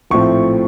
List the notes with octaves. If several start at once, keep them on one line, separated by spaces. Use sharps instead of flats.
A#1 A2 F3 A3 C4 C#6